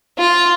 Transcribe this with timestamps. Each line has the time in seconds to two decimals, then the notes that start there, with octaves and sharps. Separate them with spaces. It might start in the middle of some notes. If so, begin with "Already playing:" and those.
0.18 F4